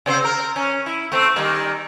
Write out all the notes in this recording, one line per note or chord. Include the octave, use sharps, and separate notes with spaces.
C#3 C4 C5
A#4
C#4
E4
A3 C4
D#3 G3 A#3